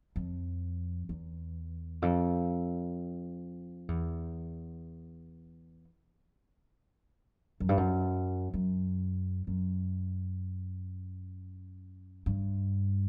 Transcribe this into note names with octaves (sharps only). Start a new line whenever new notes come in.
F2
E2
F2
E2
F#2
G2
F#2
F#2
F#2
G2